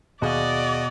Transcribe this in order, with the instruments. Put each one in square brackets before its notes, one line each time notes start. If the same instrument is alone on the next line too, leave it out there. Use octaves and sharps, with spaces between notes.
[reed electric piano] D#2 G#4 F5 [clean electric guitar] B2 [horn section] F#4 D#5 [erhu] D5